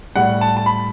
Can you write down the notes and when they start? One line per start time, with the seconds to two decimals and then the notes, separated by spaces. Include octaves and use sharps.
0.16 A2 G3 F#5
0.41 A5
0.57 A5
0.66 B5